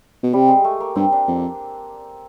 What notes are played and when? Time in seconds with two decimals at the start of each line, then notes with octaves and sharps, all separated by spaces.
0.23 B2
0.33 C3 G3
0.48 G#3
0.64 A3
0.80 A#3
0.96 G2 C4
1.12 D4
1.28 F2